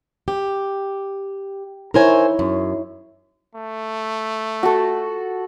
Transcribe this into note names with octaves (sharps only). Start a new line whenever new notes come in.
G4
D#4 E4 A#4 C5 C#5 G#5
F#2
A3
F#4 A4